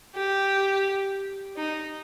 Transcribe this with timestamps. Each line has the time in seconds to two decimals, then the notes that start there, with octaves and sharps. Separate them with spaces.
0.15 G4
1.57 D#4